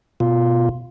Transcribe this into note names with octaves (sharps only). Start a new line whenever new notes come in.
B2 F4